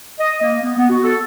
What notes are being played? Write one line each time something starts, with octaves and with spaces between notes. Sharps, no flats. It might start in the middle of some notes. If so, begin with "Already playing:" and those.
D#5
A#3
B3
B3
F#4
A4